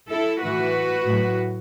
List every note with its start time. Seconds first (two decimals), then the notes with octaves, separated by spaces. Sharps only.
0.09 E4 A4
0.42 A2 E3 F#4 B4
1.06 A2 F#3